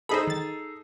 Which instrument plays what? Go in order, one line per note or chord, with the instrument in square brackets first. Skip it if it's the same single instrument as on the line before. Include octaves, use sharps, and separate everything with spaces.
[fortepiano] D#4 G#4 A4 [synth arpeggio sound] C5 D#5 B5
[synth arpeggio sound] D#3 A6